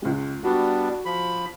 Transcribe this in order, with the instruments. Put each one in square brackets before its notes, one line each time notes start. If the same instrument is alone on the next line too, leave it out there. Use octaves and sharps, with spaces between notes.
[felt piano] C#2 G#3
[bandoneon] G3 B3 D4 [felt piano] F#4
[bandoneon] F3 B5